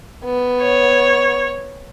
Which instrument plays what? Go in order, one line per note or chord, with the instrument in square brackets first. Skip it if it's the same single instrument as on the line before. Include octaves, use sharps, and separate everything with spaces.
[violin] B3
[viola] C#5